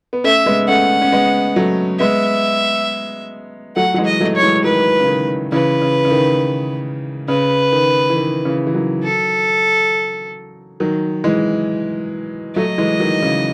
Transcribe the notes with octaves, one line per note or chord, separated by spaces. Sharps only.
B3
A3 C#4 E5
G#3 B3
A3 C#4 F#5
C#4
G#3 B3
F#3 A3
G#3 B3 E5
F#3 A3 F#5
F#3
E3 G#3
D#5
F#3 A3
C#5
E3 G#3
D#3 F#3 B4
C#3
D#3
C#3 E3 B4
C#3
C#3
D#3
C#3 B4
D#3
E3
D#3
C#3 E3
E3
D#3 F#3
A4
D#3 F#3
E3 G#3
F#3 A3 D#5
E3 G#3
D#3 F#3
C#3 E3